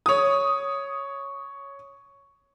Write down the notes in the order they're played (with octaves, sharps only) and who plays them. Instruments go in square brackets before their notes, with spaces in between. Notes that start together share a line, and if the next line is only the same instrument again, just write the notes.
[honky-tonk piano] C#5 D#6